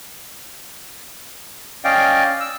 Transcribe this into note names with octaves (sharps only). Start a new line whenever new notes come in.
C#4 D5 D#5 F5 G5
E6